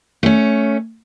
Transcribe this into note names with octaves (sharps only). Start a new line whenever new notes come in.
A3 C#4